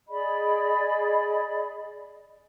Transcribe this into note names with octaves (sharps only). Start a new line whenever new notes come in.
G#4 D5 D#5 B5